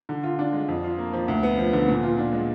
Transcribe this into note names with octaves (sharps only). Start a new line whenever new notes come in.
D3
F4
D4
G#3
F2
F4
A#3
F3
D2
B3
F3
D3
A#2
F4
D4
G#3